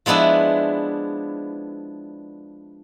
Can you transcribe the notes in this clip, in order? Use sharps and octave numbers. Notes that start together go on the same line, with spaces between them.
F3 G#3 B3 D4 E4